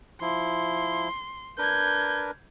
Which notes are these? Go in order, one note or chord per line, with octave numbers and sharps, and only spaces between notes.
F3 E4 C6
D4 A#4 B4 G6 G#6